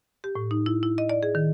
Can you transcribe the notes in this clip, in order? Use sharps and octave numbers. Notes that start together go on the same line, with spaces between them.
G4
A2
D#4
E4
E4
D#5
D5
G#4
D#3